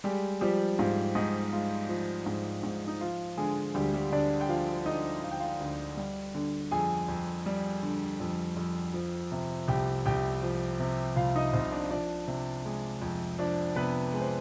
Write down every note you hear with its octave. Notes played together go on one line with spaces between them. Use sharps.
G3 G#3 G4
F3 G3 G4
G#2 F4
G#2 D#4
G#3 F4
F3
G#2
G#2
D#4
F3 F4
D3 G#3 G#4
D2 G3 G4
G3 G4
D2 D4 D5
G5
F3 F4 F5
D3 D#4 D#5
D2 F5
G5
F4 F5
D2
G3
D3
F2 G#4 G#5
F2
G3
D3
F2
F2
F3
C3
C2 G4 G5
C2 G4 G5
F3
C3
C2 F4 F5
D#4 D#5
C2 C4 C5
D4 D5
F3 D4 D5
C3
G#3
F2
F3 D4 D5
C3 B3 B4
G#3
C5